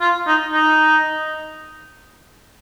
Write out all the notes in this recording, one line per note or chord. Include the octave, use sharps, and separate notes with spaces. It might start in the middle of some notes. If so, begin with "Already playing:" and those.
F4
D#4
D#4